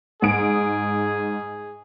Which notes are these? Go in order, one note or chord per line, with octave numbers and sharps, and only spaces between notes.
G#2 G#4 D#6 D7